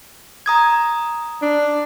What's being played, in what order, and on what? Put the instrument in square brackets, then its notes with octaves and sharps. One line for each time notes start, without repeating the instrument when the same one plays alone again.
[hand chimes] A#5 D#6 G#6
[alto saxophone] D4